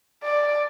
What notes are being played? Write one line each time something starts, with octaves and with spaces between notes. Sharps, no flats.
D5